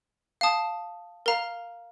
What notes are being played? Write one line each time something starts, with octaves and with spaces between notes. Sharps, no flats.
F5 A5 D#6
A#4 F5 A#5